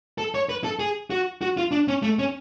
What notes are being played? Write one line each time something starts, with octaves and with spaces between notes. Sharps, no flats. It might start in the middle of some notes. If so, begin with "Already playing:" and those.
A4
C#5
B4
A4
G#4
F#4
F#4
F4
D4
C#4
A3
C#4